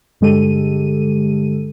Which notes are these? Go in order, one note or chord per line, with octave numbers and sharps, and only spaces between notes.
G2 D3 G#3 G4 A4 D#7